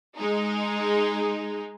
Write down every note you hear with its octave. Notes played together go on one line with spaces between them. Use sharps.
G#3 D#4